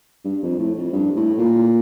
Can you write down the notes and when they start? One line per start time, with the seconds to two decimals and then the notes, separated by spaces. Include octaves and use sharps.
0.25 G2
0.42 F2
0.58 A2
0.77 F2
0.93 G2
1.16 A2
1.38 A#2